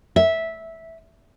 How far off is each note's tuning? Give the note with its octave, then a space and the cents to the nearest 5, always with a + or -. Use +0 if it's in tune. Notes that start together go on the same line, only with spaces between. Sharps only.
E5 -10